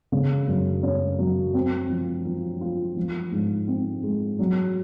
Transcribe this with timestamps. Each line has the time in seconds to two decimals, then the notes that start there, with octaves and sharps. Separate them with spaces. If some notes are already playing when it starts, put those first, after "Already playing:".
0.12 C#3
0.47 F#2
0.83 C#4
1.19 F#3
1.54 C4
1.90 F3
2.25 F3
2.61 F4
2.97 F3
3.32 G#2
3.68 C4
4.03 G#3
4.39 F#3